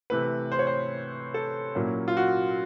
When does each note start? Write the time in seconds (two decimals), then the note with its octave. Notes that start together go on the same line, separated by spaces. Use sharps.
0.10 C3 E3 A3 B4
0.52 C5
0.59 C#5
0.67 C5
1.34 A4
1.75 A#2 F#3 A#3 C#4 E4
2.08 F4
2.17 F#4